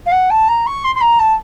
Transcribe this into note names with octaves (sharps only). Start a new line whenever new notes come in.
F5
F#5
A5
A#5
C#6
C6
C6
A#5
A5